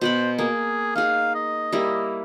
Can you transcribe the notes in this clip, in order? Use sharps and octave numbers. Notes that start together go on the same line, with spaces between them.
B2 B4 C5 B5
A#3 G#4
D#4 G#4 F5
D#5
G3 A#3 E4